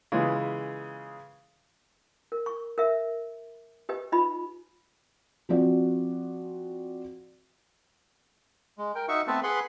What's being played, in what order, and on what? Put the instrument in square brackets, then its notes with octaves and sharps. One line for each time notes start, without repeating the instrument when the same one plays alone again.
[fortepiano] C#3 E3 G#3 B3 F4
[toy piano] A#4
C#6
A#4 E5
G4 B4 D#5
D#4 F4 D#5 B5
[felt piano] F3 C4 F#4 D5
[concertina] G#3
A#4 G5
D#4 F#4 E5 C#6
A3 B3 C4 B4 E5 A5
G#4 B4 F#5 B5 C6